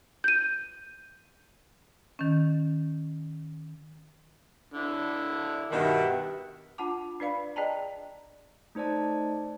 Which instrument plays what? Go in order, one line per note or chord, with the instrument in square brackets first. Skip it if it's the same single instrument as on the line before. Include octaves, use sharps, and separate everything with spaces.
[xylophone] G6 D#7
[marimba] D#3 C#4
[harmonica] D3 D4 E4
[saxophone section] G2 B2 D#3 [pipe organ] G4 E5 F#5
[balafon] D4 F4 F#5 A5 D6
D4 B4 D5 F5 B5
G#4 D5 D#5 G5 A5 A#5
[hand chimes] A3 D#4 C5 D5 A5